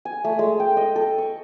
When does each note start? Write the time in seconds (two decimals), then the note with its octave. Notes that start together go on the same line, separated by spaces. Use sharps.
0.05 G#5
0.24 A3
0.39 G#3
0.60 G5
0.77 D#5
0.96 A4
1.18 C#6